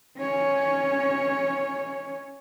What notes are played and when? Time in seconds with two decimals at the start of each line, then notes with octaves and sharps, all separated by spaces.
0.19 C#4 C#5